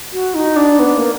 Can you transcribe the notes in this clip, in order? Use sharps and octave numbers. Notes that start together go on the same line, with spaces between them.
F#4
D#4
D4
B3
A#3